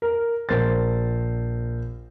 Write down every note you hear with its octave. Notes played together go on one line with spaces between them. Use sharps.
A#4
A#1 A#4 C5 A6